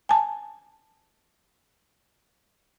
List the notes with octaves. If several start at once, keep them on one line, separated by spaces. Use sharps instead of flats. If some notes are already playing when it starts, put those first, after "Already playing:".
G#5 A5